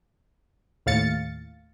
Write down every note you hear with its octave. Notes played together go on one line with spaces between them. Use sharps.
D#2 A2 F5 A6 C#7